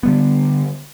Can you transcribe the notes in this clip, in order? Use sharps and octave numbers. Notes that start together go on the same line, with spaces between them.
D3 G3 B3